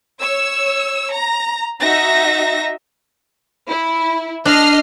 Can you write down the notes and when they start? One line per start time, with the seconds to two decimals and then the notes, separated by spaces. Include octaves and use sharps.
0.21 C#5 E6
1.13 A#5
1.81 D#4 F#4 E5 A#6
3.68 E4
4.46 D4 D#5 F6 C7